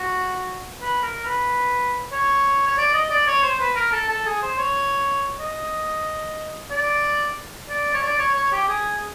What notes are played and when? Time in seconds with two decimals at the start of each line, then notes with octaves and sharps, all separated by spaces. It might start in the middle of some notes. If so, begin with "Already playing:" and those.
Already playing: F#4
0.81 B4
1.02 A#4
1.25 B4
2.12 C#5
2.67 C#5
2.78 D5
2.94 D#5
3.10 D5
3.27 C#5
3.43 C5
3.60 B4
3.76 A#4
3.92 A4
4.09 A4
4.26 G#4
4.42 C5
4.58 C#5
5.40 D#5
6.71 D5
7.69 D5
7.94 C#5
8.03 D5
8.18 C#5
8.35 C#5
8.52 G4
8.68 G#4